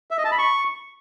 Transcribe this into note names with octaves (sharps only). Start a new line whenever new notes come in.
E5
D#5
A5
B5
C#6